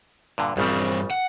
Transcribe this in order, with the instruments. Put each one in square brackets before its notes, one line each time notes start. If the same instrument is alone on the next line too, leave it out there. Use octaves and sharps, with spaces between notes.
[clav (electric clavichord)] G2 A#2 D3
[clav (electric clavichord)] A#1 C#3 G3 [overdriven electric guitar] G2 C4
[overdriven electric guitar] F#5